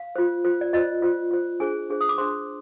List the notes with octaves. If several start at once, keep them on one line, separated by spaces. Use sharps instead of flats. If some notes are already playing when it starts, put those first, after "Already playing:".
Already playing: F5
F4 C5
F4 C5
D5
F4 C5 D#5
F4 C5
F4 C5
D4 G#4 C5 G#5
D4 G#4 C5
D#6
D6
D4 G#4 C5 C6